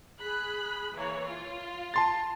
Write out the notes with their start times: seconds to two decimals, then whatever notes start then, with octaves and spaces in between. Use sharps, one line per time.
0.18 G#4 B5 F#6
0.96 E3 A#3 C#5
1.24 F4
1.94 A5 C6 A6